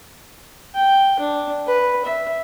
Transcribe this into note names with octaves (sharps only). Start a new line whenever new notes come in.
G5
D4
B4
E5